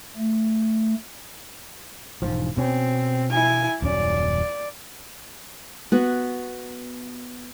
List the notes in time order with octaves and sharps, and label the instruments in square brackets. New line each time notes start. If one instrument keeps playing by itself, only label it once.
[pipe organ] A3
[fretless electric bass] E1 G#2 F3
[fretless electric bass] B2 C#4 [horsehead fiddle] C4
[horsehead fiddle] E4 G#5
[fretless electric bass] D#1 F#2 C#4 [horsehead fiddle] D5
[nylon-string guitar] B3 F#4